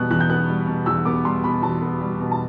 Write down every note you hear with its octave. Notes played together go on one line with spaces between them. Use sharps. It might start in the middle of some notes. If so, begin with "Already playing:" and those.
Already playing: E2 B2 G3 B3 F#6
E2 F#6
G6
B3 F#6
G3
B2
E2 E6
B3 D6
G3 C6
B2 B5
E2 A5
B3
G3
B2
A5